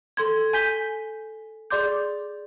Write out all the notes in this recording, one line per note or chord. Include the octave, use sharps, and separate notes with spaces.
A4 C6 G#6
G#5 G6 B6 G7
G#4 D5 C6 D6 G6